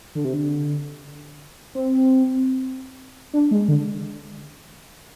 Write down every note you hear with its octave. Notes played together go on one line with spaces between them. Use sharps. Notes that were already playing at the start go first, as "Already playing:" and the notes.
D3
C3
D3
C4
D4
G#3
D3